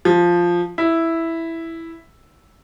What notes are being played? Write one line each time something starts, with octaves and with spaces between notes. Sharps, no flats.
F3
E4